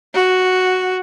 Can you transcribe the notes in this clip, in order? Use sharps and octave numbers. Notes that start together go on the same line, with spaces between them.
F#4